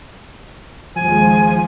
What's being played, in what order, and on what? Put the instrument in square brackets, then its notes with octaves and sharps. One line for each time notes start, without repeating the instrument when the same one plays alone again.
[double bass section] D#2 G#3 [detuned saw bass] F3 [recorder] G#5